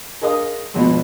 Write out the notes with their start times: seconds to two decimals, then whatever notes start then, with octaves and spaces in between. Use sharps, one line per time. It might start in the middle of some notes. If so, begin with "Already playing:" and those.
0.21 G#4 A#4 D#5 F5 D#6
0.74 G#1 F2 B2 B3